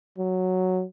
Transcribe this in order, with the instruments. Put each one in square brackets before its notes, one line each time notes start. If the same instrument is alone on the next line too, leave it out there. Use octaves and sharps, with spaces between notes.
[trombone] F#3